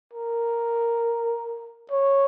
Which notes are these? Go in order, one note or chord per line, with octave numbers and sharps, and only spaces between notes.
A#4
C#5